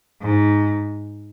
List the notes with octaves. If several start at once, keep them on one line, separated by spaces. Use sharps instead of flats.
G#2